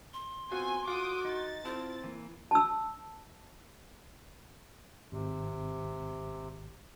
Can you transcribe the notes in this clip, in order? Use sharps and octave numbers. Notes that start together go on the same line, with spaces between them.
C6
B3 C4 F4 F#4 G#5
F4 F#4 D6 D#6
D#4 A6
C4 E4 F4 A5
E3 A#3
A5 E6
G#1 C3